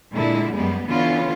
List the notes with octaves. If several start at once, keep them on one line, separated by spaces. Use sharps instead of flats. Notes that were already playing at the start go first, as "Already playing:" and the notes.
A#2 D3 G#3 E4
F#2 G3 G#3 B3
D3 E3 B3 C#4 F4